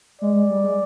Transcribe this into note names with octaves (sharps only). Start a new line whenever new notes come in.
G#3 D5
G#3
G3
G#3